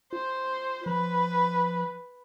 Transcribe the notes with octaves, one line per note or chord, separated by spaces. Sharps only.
F4 C5
F3 B4